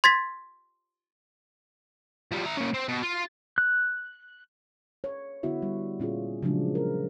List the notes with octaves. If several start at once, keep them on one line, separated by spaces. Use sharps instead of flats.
C6 G#6 A6 B6
F3 G3
E4 A#5
A#3 C#4
C4
B2
F4
F#6
C#5
D3 B3 E4 F#4 E5
G3
A#2 C#4 F4 G#4
C#3 F3 F#3 G#3 D4
A#4